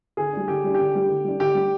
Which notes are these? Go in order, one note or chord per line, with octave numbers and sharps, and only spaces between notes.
D3 G#4
G3 D4
D3 G4
G3 D4
D3 G4
G3 D4
D3
G3 D4
D3 G4
G3 D4